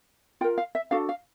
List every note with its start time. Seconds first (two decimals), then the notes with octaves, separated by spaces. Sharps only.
0.41 F4 G5
0.44 A#4
0.58 F5
0.75 E5
0.91 D4 F#4 A4 F5
1.09 F5